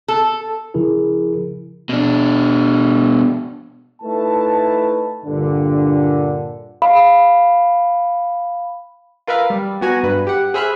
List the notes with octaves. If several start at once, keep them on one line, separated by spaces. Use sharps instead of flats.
A4
C#3 F3 E4 G#4 A#4
B2 D4
A3 D#4 E4 B4 A5
G2 A#2 D3
F5 B5
F4 A#4 B4 E5 F5
G3
B3 F#4 G#5 A#5
G2 B4
G4 F#5
G#4 C5 E5 B5 F6 F#6